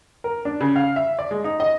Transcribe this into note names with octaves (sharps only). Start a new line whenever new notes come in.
A#4
D4
C#3
F5
E5
D5
G#3
D#4
D#5